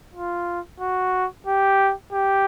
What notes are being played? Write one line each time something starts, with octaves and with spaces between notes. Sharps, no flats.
F4
F#4
G4
G4